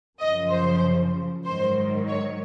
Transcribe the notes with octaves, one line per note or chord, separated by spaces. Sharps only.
F#2 C#3 F3 D#5
C5
G#2 D#3 F#3 C5
C#5